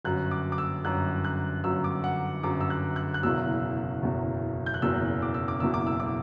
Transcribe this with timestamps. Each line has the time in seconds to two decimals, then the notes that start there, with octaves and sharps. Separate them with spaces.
0.05 G1 F#2 F#3 F#6
0.31 D6
0.52 D6
0.58 E6
0.85 G1 F#2 F#3 F#6
1.24 F#6
1.64 G1 F#2 F#3 E6
1.84 D6
2.04 F#5
2.43 G1 F#2 F#3 D6
2.61 E6
2.70 F#6
2.96 F#6
3.14 F#6
3.23 F#1 E2 B2 F#3 E6
4.03 F#1 E2 B2 F#3
4.66 G6
4.74 F#6
4.82 F#1 E2 B2 F#3 E6
5.22 D6
5.34 E6
5.48 D6
5.60 F#1 E2 B2 F#3 E6
5.74 D6
5.87 E6
6.00 D6